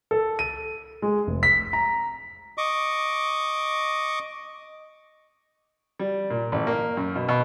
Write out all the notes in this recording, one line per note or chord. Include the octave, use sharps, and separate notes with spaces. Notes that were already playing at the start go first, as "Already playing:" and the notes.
A4
D#7
G#3
F1
B6
A#5
D#5 C#6 D6
G3
A#2
A1
A#3
F#2
B2
B2